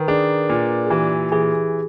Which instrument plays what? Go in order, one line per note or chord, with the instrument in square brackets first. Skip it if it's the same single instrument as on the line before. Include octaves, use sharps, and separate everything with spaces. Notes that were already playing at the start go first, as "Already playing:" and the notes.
Already playing: [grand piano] D#3 [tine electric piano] A#4 B4
[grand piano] D4 [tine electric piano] G#4
[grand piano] A#2
[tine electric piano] G#4
[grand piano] E3 [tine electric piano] G4
[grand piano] E3 [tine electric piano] G#4